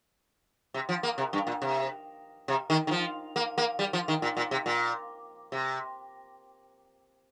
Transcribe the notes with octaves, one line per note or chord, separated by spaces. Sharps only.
C3
F3
A#3
C3
G2
A#2
C3
C3
D#3
D#3
F3
A#3
A#3
G3
F3
D#3
A#2
A#2
C3
A#2
C3